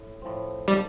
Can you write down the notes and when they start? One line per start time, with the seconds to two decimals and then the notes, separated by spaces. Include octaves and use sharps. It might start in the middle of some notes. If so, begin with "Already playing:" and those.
Already playing: A2
0.22 A2 F3 C4
0.68 D#3 G3 A#3 D#4 A4